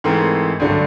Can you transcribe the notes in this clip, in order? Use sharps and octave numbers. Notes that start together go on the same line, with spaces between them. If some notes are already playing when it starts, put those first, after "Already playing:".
G#2 E3 A3 C4 A#4
G2 D3 F#3 A3